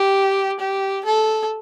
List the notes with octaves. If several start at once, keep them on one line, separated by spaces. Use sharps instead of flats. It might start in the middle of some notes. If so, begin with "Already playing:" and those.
Already playing: G4
G4
A4